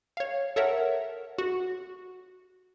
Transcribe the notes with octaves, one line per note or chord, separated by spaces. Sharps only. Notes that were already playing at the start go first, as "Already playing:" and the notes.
C#5 F5
A4 A#4 C#5 E5 F#5
F#4